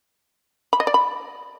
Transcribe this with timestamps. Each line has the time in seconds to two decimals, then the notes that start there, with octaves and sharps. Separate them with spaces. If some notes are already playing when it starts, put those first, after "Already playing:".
0.73 B5
0.80 D#5
0.87 D5
0.94 B5